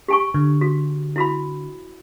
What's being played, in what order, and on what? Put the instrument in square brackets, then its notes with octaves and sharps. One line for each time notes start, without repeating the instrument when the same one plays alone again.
[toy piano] G4 G#5 C#6
[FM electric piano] D3
[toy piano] F#4
E4 F#4 B5